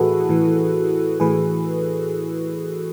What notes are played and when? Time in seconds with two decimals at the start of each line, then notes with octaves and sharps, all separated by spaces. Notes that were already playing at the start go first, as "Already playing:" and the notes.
Already playing: A2 E3 E4 F#4 G#4 A4 B4
0.29 A2 E3
1.20 A2 E3 G#4 B4